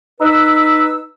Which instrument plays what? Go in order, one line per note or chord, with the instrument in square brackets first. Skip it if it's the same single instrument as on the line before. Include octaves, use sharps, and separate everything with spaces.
[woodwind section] D#4 B4 E6